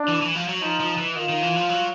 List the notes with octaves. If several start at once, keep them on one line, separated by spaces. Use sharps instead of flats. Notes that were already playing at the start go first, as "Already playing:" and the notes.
Already playing: D4
E3
E3
F3
F#3
F3 D#4
F3
E3
D#3 F4
D#3
E3
F3
F#3